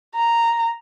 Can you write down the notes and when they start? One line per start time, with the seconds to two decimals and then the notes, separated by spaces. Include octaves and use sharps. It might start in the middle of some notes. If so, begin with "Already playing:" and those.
0.15 A#5